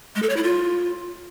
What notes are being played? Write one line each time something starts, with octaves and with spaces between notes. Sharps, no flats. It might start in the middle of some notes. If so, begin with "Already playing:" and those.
G#3
A4
C#5
E4
F4